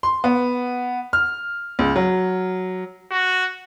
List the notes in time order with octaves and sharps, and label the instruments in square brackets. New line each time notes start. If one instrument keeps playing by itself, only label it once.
[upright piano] C6
B3
F6
C#2
F#3
[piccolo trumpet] F#4